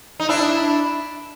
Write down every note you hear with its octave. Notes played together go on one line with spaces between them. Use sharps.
D#4
D4 E4